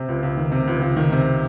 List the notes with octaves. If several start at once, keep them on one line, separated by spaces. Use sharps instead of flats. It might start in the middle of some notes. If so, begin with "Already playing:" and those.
Already playing: C3
C#2
C#2
D#3
C3
C#2
C#2
D#3
C3